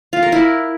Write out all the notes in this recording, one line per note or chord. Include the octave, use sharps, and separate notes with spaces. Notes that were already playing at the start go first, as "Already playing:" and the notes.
F4
A#4
E4